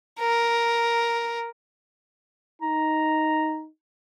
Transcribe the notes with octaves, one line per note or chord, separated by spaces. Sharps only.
A#4
D#4 A#5